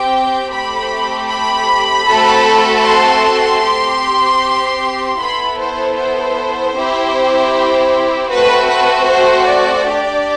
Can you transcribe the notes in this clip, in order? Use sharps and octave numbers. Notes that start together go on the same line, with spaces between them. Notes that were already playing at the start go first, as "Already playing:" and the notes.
Already playing: C4 G4 G5
A3 C4 G4 B5
B5
A3 C4 F#4 A4
C6
C4 G4
B3 E4 A4 B5
C5
C5
C4 E4 G4
A3 C4 F#4 B4
B4
C5
D5
D4 G4